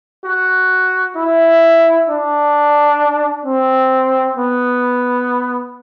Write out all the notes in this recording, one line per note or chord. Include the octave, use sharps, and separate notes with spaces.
F#4
E4
D4
C4
B3